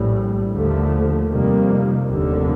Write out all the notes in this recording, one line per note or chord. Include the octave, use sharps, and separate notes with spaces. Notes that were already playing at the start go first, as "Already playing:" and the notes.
Already playing: A#1 A2 G3
D#2 D3 F3 A3
F2 C3 D#3 G3 A#3
F1 D#2 D3